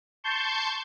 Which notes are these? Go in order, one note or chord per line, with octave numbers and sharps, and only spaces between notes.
A5 C6 C#6 G6